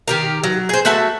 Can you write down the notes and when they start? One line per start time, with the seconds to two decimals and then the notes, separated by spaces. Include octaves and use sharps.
0.08 D#3 G4 A#4
0.44 F#3
0.69 G#4 C5
0.85 A3 F#4 E5 A5